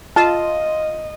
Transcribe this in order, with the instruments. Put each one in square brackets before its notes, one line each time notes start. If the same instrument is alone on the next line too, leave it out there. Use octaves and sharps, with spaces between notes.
[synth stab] F4 [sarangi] D#5 [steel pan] A5